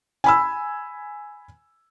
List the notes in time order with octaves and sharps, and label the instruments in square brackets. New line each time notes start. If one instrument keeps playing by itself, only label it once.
[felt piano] G#5 B5 E6